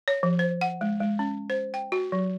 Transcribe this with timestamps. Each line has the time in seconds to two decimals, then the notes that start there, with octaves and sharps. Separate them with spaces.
0.08 C#5
0.23 F3
0.39 C5
0.61 F#5
0.81 G#3
1.00 G#3
1.19 C#4
1.50 C5
1.74 G5
1.92 F#4
2.12 F#3